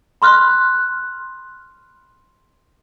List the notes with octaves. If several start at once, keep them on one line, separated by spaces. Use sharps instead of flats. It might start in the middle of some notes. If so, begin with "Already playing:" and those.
B5 C6 F6 F#6